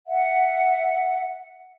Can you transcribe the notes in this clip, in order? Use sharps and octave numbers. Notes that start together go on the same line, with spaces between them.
E5 F#5